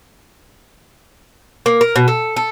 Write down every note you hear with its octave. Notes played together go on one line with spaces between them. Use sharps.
A#3
A#4
B2
A4
A4